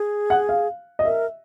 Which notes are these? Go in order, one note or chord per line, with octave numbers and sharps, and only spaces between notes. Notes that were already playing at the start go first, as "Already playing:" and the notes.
Already playing: G#4
F#5
F5
D#5
A#4 E5